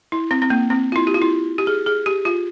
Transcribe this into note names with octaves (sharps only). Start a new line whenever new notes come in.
E4
C4
C4
A#3
C4
F4
E4
G4
F4
E4
G4
G#4
G#4
G4
F4